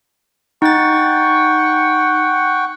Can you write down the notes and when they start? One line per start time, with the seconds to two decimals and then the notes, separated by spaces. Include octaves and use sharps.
0.62 D#4 F#5 G5 C#6 A6